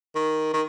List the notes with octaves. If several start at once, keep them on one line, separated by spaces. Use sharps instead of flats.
D#3
D#3